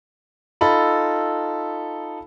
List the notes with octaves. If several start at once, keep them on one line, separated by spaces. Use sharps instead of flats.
D#4 F4 A4 B5